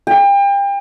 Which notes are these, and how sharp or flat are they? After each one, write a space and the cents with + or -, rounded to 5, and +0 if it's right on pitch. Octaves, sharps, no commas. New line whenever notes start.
G5 +35